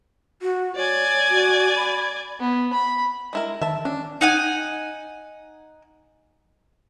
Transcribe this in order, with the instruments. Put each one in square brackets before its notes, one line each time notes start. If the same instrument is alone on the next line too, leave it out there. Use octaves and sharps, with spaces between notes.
[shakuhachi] F#4
[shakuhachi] C#5 [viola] D5 G#5
[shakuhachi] F#4
B5
[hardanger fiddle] B3
B5
[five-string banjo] G#3 E4 A#4
[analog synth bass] D#3 [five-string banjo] E5 A5
[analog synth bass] C#4 [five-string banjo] D4
[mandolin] D#4 F#5 G#5